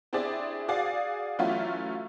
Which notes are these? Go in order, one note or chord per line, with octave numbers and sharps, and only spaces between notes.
C4 D4 E4 G4 G#4 D5
F#4 G#4 D5 F5
E3 F#3 A3 C#4 E4 F4